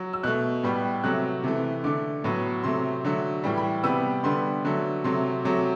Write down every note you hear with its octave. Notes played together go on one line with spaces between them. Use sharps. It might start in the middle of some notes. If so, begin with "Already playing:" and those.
Already playing: F#3
E6
B2 A3 F#6
A2 G3 B3
C3 F#3 A3 F#6
C3 E3 A3
D3 A3 D6
A2 F#3 B3
C3 F#3 A3 C6
D3 F#3 A3
A2 E3 G3
B5
C3 G3 B3 E6
D3 G3 B3 C6
D3 F#3 A3
C3 F#3 A3 C6
C3 F#3 A3